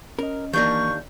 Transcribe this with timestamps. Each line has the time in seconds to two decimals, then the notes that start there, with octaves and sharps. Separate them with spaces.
0.19 C#4 A#4 D#5
0.53 D#2 E3 A#3 D4 A#4 C#6 G6